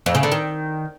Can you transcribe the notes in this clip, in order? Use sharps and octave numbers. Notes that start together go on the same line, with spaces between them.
F2
C#3
D3
D#3